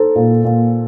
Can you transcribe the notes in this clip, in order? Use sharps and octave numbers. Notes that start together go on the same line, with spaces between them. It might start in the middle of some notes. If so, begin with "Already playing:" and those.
Already playing: D#4 A4 C5
A#2
A#2